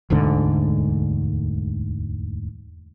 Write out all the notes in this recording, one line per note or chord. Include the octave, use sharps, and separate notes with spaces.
E1 D2 G#2 D3